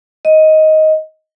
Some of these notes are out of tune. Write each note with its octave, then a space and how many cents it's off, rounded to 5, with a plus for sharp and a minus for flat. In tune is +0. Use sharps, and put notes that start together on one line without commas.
D#5 +10